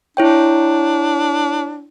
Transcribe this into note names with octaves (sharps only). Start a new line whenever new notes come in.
D4 E4 C#5 G5